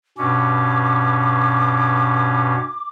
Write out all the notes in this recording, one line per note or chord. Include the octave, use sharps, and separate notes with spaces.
G2 B2 C#4 D6